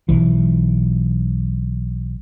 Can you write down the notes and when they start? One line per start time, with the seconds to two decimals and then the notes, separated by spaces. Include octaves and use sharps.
0.09 B1 E3